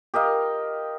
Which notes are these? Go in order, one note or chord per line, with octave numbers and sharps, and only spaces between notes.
G4 A#4 D#5 F5